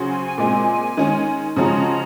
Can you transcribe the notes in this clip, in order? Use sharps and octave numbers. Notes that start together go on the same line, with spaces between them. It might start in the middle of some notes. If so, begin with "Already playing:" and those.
Already playing: C#3 F#3 C#4 F#4 C5
G#5
G#5
A#2 G#3 C4 G#5
D#3 G#3 C#4
C#3 F3 G#3 C#4 F#4 A#5